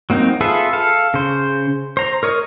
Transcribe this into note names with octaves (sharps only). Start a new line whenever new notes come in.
F#3 A#3 C4 D#4
F4 G#4 A4 B4 E5
A4 F5
C#3 C5
C5 A#5
A#4 C#5 D#5